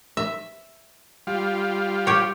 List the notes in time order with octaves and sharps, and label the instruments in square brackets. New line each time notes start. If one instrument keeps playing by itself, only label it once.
[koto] E5
[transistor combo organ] G3 F4
[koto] G4 C#5